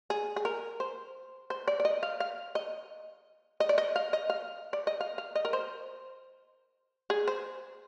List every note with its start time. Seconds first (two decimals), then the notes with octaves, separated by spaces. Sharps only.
0.10 G#4
0.36 G#4
0.45 A#4
0.80 C5
1.50 C5
1.68 D5
1.80 D5
1.85 D#5
2.03 F5
2.20 F5
2.55 D#5
3.60 D#5
3.69 D5
3.78 D#5
3.96 F5
4.13 D#5
4.30 F5
4.73 D5
4.87 D#5
5.01 F5
5.18 F5
5.35 D#5
5.45 A#4
5.53 C5
7.10 G#4
7.28 C5